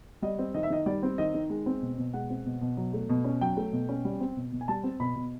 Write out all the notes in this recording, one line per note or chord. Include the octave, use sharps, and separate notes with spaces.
G3 D#5
C4
D#3 D#5
E5
D#3 D#5
G3 D5
C4
D#3 D#5
D#3
G#3
C4
B2
B2
G#3 F#5
C4
B2
B2
F#3
A3
B2
C#4
F#3 G5
A3
B2
C#4
G3
C4
B2
B2
G#5
G3 A5
C4
B2 B5
B2